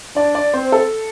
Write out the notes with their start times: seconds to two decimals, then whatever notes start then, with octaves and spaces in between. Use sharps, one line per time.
0.16 D4 D5
0.35 D5
0.53 C4 C5
0.72 A4